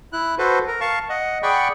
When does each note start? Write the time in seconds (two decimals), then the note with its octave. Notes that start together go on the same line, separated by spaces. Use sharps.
0.13 E4 F#6
0.38 F#4 A4 B4 C5
0.67 A#4
0.81 F5 A5 C#6
1.09 D#5 F#5
1.43 G#4 D5 F#5 G5 B5 C#6